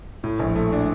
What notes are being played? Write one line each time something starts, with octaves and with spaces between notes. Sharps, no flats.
A2
A#1
A3
D4